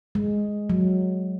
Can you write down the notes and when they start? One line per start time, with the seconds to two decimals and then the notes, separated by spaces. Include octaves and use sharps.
0.15 G#3
0.70 F#3